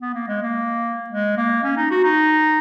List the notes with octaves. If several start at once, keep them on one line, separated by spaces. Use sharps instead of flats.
B3
A#3
G#3
A#3
G#3
A#3
C#4
D#4
F#4
D#4